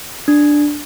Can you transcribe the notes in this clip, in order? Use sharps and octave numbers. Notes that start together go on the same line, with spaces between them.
D4